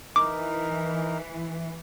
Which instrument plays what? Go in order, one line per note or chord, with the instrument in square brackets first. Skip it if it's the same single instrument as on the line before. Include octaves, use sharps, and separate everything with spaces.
[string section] E3 [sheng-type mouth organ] D#4 A#4 [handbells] D6